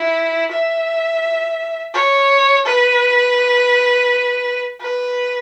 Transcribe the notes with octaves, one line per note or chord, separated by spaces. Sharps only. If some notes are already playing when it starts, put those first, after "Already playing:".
Already playing: E4
E5
C#5
B4
B4